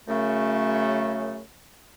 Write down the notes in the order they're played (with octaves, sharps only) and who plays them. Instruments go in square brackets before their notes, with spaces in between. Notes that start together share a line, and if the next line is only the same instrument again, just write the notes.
[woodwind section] F#2 C#3 A3